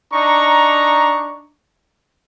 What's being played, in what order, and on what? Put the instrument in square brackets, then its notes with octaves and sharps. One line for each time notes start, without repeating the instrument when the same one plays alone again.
[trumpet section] D4 D#4 A#5 C#6